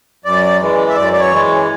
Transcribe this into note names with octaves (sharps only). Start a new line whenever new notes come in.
F#2 D5
E3 G#3
E5
F#2 D5
D5
C#5
E3 G#3